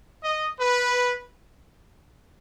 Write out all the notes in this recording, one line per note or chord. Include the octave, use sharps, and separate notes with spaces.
D#5
B4